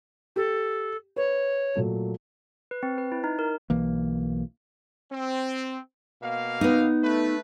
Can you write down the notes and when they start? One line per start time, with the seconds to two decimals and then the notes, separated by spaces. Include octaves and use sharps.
0.36 G4 A4
1.16 B4 C#5
1.75 A#2 F#3 A3
2.71 B4
2.83 C4
2.98 B4
3.12 E4
3.24 D#4
3.39 A#4
3.70 B1 E3 A#3
5.12 C4
6.22 B2 A#3 F5
6.61 B3 D#4
7.03 A3 B4